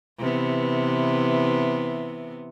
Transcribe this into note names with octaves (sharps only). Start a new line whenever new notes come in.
C3 E3 B3